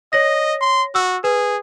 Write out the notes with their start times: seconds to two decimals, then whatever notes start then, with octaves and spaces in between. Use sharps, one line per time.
0.13 C#5 D#5 A#6
0.61 C6
0.95 F#4 E6
1.24 G#4 B4